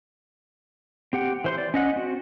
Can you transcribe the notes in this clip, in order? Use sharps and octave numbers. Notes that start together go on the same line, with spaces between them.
C4 G4 F#5 G5
E3 C5 C6
D5
C#4 D#5 F#5
C4 F#4